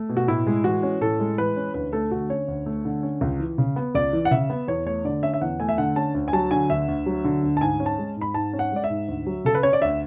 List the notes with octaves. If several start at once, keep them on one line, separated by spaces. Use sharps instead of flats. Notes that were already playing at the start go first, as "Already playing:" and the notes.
Already playing: A3
B2
F#4
A2 E4
G#3
E3 F#4
C#4
A2 A4
G#3
E3 B4
C#4
D2 B4
A3 A4
D3 F#4
C#4 C#5
D2
A3
D3
C#4
C#2
E3
C#3
B3
C#2 D5
E3
F#5
C#3 E5
B3
E2 C#5
A3 C#5
D3 D5
C#4 E5
E5
E2 F#5
A3 G#5
E5
D3 F#5
C#4 A5
D2
G#5
F#3 A5
D3 G#5
D2 E5
D2
F#3
D3
D2
A5
G#2 G#5
C#4
A5
G#3
G#2 B5
G#2 A5
C#4
F#5
G#3 D5
E5
G#2
D2
F#3
C#3 A4
B4
C#4 C#5
D5
D2 E5